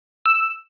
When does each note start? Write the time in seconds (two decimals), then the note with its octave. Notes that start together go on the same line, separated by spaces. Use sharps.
0.26 E6